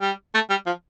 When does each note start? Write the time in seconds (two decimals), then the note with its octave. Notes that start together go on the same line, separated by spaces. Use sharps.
0.01 G3
0.34 A3
0.50 G3
0.66 F3